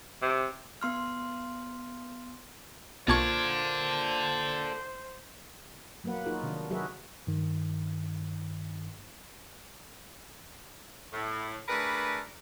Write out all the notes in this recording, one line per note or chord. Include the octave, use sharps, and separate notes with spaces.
C3
B3 C6 F6
B1 A#2 A4 C5 D5 A5 C#6 G#6
F#3 A#3 B3 B4 F#5
D#4 F4 F#4 G#4 A#4
C3 D#3 D4
F#3 F#4 G#4 A#4 B4 E5
G2 D#3
A2
A3 D4 G#4 A#4 B4